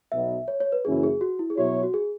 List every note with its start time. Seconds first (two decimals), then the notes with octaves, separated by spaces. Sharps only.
0.11 B1 B2 F#3 B3 E5
0.48 C#5
0.60 C#5
0.72 B4
0.85 F#1 F#2 E3 C#4 E4 G#4
1.03 G#4
1.21 F#4
1.39 E4
1.50 G#4
1.57 B2 F#3 E4 F#4 C#5
1.83 F#4
1.94 G#4